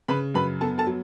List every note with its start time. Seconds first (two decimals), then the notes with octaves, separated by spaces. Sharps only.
0.08 C#3 B4 B5
0.34 F#2 B4 B5
0.61 B3 A4 A5
0.78 A4 A5
0.87 F#3